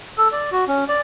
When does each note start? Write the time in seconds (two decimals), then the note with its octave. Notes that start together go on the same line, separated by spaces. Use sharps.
0.18 A4
0.32 D5
0.52 F#4
0.68 C#4
0.89 D5